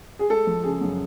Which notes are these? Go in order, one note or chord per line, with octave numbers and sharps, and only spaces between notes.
G#4
G#3 A4
F3
C#3 G#4
F#2